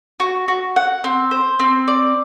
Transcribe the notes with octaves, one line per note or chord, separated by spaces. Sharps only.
F#4
F#4
F#5
C4
C5
C4
D5